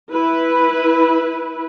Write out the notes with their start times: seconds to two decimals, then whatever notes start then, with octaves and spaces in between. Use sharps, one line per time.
0.11 E4 B4